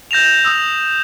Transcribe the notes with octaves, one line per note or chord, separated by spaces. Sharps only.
G6 A#6 E7 F7
D#6 E6